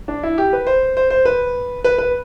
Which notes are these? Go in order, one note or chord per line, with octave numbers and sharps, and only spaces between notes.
D4
E4
G4
B4
C5
C5
C5
B4
B4
B4